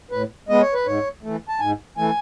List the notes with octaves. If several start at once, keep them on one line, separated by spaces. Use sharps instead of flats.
A2 B4
G#3 B3 D#5
C#5
B4
G#2 C#5
E3 A3
A5
G#2 G#5
E3 A3 G#5